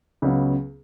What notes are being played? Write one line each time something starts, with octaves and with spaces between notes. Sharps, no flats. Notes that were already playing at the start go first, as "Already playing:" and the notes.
C#2 C#3 F#3 B3